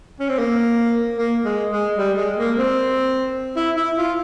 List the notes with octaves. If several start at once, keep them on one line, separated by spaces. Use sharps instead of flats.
C#4
C4
A#3
A#3
G#3
G#3
G3
G#3
A#3
C4
E4
E4
F4